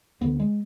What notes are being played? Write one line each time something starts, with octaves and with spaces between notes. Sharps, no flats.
D2 D3 B3
G#3